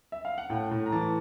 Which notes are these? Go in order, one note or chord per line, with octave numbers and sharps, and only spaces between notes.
E5
F5
F#5
A2 G5
A2
A#5
E3 A5